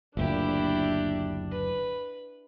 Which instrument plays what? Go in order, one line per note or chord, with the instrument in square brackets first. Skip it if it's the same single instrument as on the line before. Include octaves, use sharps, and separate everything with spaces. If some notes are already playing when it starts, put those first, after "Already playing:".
[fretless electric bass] F#1 D2 A#2 [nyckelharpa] D4 [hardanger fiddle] E4 G4
[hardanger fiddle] B4